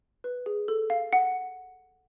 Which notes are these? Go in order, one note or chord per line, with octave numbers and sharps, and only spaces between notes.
B4
G#4
A4
F5
F#5